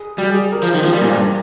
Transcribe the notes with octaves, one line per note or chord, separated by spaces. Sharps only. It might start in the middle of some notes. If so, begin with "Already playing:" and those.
Already playing: G#4
G3 G4
G#4
G#4
A#4
F3 C5
D#3 A#4
F3 G#4
G3 C5
A#4
A#2
A#4
G2
A#4